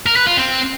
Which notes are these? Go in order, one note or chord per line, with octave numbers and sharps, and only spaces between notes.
A#4
B4
F4
C4